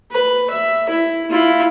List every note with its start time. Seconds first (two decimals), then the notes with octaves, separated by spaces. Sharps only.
0.11 B4
0.50 E5
0.89 E4
1.31 E4 F4